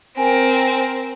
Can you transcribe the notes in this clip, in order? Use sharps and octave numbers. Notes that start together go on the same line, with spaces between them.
C4 A#4 G#5